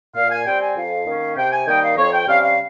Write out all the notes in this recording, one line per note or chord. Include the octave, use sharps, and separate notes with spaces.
A#2 F5
G#5
G3 C4 G5
G#5
F2 F5
D#3 A#3 C#4
C3 G5
G#5
D#3 G3 A#3 D#4 G5
F5
F2 C#5
G5
C3 G3 C#4 F5
F5